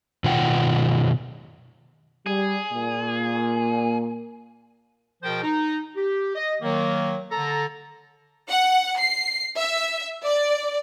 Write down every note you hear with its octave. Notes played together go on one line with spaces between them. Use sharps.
B2 D#3 F4 F#5 G5
G3 G#4
A#2 A#3
B2 F3 G#4 A#4 C5 G5
D#4
G4
D#5
D#3 F#3 A#3
D3 A4 A5 A#5
F#5
C7
E5
D5